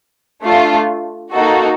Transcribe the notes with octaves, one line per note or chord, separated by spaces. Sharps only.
A3 D4 F4
A#3 D#4 F#4 A4